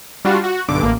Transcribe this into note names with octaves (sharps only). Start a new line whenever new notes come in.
G3 D4 F4 F#4
F#4
B1 G2 D3 D6
A1 A#3